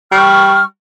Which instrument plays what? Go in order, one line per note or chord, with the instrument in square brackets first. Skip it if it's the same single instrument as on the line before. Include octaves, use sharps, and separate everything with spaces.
[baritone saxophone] G3 [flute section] C#6 F6